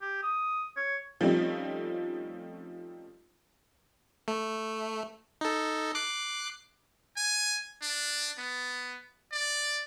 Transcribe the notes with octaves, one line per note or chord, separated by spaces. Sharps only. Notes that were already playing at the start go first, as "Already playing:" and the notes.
G4
D#6
C#5
F3 G3 A3 C4 C#4 D#4
A3
D#4 A4
D6 F#6 C7
G#5
D4
B3
D5